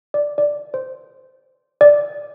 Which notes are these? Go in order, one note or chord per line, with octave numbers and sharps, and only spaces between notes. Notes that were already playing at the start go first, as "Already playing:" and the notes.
D5
D5
C5
D5